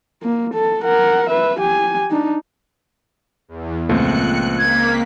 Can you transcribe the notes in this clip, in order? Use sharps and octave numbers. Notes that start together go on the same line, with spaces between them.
A#3
A4
A#4 F#5
B4 E5
G4 G#5
D4 D#4
E2
C#2 A#2 F3 A3 C4 F#6 C#7
A#3 G#6 B6